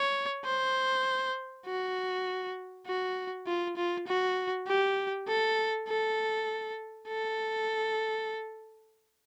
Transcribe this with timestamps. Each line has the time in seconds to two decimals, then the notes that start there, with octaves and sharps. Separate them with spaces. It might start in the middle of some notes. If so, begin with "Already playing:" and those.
Already playing: C#5
0.45 C5
1.66 F#4
2.87 F#4
3.47 F4
3.77 F4
4.07 F#4
4.67 G4
5.28 A4
5.88 A4
7.08 A4